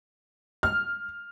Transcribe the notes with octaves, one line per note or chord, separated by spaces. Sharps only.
F6